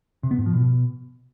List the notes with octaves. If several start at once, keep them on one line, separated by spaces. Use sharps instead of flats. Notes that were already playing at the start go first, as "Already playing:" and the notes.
C3
B3
G#2
F3
B2